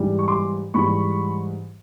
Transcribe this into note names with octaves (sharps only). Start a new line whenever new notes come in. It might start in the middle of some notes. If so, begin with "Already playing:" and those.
Already playing: G#2 E3 G3
C#6
C6 D6
G#2 E3 G3 B5 C#6